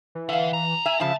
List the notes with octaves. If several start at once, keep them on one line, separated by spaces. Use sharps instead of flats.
E3
D3 E5 F5
C2 A#5
E5 G#5
C2 C#3 F3 F4 E5 A5